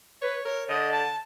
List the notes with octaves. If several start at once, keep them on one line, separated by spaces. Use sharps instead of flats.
B4 C#5
A#4 C#5
D3 D#5
A5